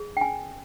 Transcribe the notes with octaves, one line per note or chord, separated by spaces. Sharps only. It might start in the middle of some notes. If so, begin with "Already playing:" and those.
Already playing: G#4
G5
C#4 G#5